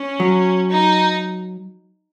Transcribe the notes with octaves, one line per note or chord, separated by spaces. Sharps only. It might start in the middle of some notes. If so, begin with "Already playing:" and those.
Already playing: C#4
F#3
D#4